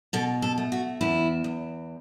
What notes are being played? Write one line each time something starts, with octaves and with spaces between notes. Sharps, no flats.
B2 A4
A4
A3
F#4
E2 E4
E2